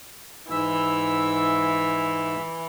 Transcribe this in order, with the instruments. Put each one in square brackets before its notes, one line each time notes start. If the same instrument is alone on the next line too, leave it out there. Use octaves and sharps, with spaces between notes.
[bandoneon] G#2 E5 E6 [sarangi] E3